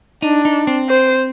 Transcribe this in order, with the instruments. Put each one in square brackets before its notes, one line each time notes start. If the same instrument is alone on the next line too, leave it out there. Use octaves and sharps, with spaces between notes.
[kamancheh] D4 [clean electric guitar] D#4
[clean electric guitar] D#4
C4
[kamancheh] C5